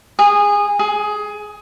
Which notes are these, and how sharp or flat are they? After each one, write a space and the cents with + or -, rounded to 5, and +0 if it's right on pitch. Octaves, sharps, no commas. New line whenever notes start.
G#4 -20
G#4 +15